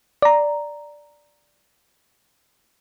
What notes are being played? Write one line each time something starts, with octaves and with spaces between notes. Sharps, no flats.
D5 A#5